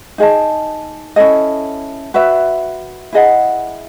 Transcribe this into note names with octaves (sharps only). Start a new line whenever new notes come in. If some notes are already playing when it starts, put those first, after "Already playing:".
D#4 G#4 D#5 A5
C#4 E4 A4 D#5
F#4 B4 E5
E4 G#4 D#5 F#5